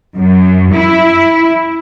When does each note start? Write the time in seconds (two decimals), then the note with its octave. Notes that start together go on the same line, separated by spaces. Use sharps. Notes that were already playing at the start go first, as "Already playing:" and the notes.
0.18 F#2
0.75 E4